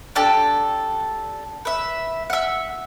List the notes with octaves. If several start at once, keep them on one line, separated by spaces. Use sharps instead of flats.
D4 G4 A4 A5
B4 E5
E5 F#5